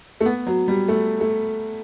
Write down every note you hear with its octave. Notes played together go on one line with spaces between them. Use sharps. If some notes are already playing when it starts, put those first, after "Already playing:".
A3
B3
F#3
G3
A3
A3